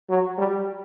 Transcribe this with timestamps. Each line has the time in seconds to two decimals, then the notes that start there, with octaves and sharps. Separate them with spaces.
0.10 F#3
0.38 G3